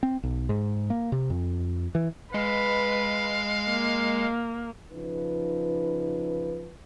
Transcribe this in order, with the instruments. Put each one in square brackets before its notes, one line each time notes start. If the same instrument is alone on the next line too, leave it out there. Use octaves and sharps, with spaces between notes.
[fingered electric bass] C4
B1
G#2
A#3
C3
F2
E3
[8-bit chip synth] G#3 [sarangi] B4 [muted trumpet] F5
[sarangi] A#3
[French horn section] C#3 F3 D#4 B4